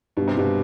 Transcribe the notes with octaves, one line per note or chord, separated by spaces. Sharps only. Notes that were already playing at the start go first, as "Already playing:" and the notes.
G2 B2
C3
G2 B2